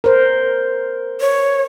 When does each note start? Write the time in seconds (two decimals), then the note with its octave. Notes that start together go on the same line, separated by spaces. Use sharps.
0.04 A#4 C5
1.21 C#5